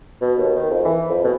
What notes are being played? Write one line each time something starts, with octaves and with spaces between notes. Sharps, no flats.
B2
D#2
D#3
F2
E3
F2
B2